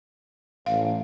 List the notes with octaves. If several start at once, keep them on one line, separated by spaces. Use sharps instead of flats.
A1 F5